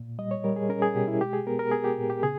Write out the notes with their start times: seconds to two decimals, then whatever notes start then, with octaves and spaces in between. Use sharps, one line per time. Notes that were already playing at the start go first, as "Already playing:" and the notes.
Already playing: A#2
0.19 G3 D#5
0.31 C#5
0.44 G3 A#4
0.56 G#4
0.69 C#4 A#4
0.82 G#4
0.95 B2 G4
1.08 E4
1.21 G#3 G4
1.33 G#4
1.47 B3 A#4
1.59 A#4
1.71 B3 G#4
1.84 G4
1.98 A#2
2.10 G4
2.23 C#3 G#4